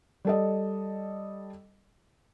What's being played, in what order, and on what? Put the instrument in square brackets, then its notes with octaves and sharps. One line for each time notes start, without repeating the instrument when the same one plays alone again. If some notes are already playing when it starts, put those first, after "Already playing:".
[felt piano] G3 A4 D#5